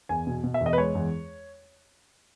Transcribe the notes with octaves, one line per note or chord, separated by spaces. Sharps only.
E2 G#5
B2
B2
E5
E2
D#5
B4
G#3 C#5
E2